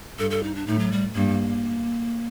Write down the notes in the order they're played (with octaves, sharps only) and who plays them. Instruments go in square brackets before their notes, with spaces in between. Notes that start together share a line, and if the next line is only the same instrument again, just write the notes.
[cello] G2 [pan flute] A4
[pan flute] A4
D#4
D4
[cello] A2 [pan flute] D#4
[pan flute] F#3
G3
[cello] G2 [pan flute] A#3